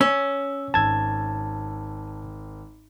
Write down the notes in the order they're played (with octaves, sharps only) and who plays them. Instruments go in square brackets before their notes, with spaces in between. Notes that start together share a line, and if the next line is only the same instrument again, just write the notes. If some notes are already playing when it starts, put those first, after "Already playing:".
[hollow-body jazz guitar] C#4 [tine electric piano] E6
[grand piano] G#1 E6 [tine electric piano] A5 G#6